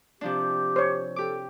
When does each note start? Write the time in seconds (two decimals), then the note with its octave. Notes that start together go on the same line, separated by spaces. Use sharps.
0.21 C3 F3 D4 G4
0.76 C5 C#5
1.16 G4 A4 D6